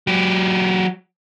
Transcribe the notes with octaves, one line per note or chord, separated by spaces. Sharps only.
F#3 G4